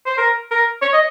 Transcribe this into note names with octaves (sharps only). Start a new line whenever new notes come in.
C5
A#4
A#4
C#5
D#5